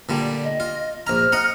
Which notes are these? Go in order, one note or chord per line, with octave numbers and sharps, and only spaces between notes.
A#2 D3 G3
D#5
F4
A#1 A#5 F6
D#5 F#5 A#5